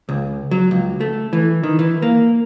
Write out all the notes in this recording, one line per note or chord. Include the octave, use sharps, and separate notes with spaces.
C#2
F#3
C#2
A3
E3
D#3
E3
A#3